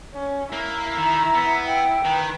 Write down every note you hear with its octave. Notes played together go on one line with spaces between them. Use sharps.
C#4
A#3 E4
D#3 A#5
B3
G5
D#3 B4